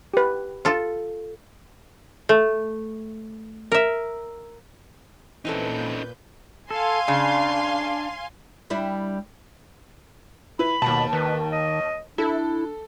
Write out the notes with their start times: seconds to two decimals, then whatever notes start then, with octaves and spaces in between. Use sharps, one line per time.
0.14 G4 B4
0.65 F4 A4
2.29 A3
3.72 A#4 E5
5.45 A#2 E3 C4 C#4 D#4 A4 B4 G6
6.71 A4 F5 G#5 C6
7.08 C#3 D4
8.70 G3 D4 E4
10.59 E4 B4 B5
10.82 D#2 B2 A5
11.13 D#3 B4
11.52 D#5
12.18 D4 E4 A4